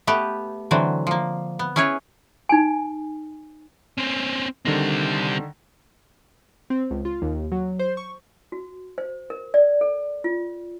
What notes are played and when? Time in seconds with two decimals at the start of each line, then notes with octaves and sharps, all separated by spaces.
0.07 A3 B3 G4 B4
0.71 D3 E3 F#3 C4
1.07 F3 A#3
1.59 B3
1.76 C#4 E4 G#4 B4 C#5
2.49 D#4 G#5
3.98 C4 C#4
4.65 D3 D#3 G3 C4 A#6
6.70 C4
6.91 C#2
7.05 F4
7.22 D#2
7.52 F#3
7.79 C5
7.97 C#6
8.52 F#4
8.98 C5
9.30 A#4
9.54 D5
9.81 A4
10.24 F4